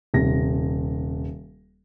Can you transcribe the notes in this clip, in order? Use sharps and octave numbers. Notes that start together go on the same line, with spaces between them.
D#1 C3 A#6